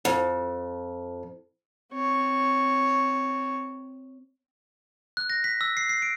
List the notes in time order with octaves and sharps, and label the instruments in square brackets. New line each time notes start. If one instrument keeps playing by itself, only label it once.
[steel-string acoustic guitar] F2
[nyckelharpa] C4 C#5
[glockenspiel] F#6
A#6
B6
E6
C7
C7
D7